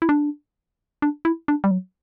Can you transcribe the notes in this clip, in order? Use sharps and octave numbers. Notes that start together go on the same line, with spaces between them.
E4
D4
D4
E4
D4
G3
F#3